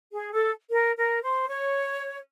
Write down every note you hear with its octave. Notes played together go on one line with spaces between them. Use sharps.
G#4
A4
A#4
A#4
C5
C#5